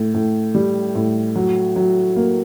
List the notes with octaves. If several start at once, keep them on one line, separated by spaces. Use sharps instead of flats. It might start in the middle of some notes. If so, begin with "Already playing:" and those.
Already playing: A2
A2
G3
A2
F#3
F#3
A#3